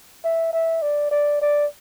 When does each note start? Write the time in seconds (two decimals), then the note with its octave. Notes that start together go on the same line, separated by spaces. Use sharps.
0.24 E5
0.53 E5
0.82 D5
1.11 D5
1.42 D5